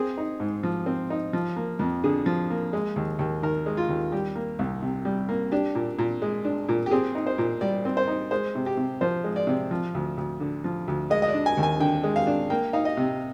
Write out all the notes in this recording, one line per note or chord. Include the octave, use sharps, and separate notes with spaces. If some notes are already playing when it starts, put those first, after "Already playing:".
Already playing: C4 G#4
D#4
G#2
F3
C4
D#4
F3
A#3
F2
D3 G#4
F3
A#3
G#3
D#2
D#2
D#3 A#4
G#3
F4
D#2
G3 G4
A#3
C2
C3
G3
A#3
D4 G4
A#2
A#2
G#3
D4
A#2
G4
C4 G#4
D#4
C5
A#2
G3 D5
C4
C5
D#4
G#3 C5
C3
G4
C3
F3 C5
G#3
D5
C3
F3
D2
D2
D3
F3
D2
G#3 D#5
D#5
D5
D4
G#5
D#2
G#5
D3 G5
G#3
F5
D4
A#3 G5
D#4 F5
D#5
C3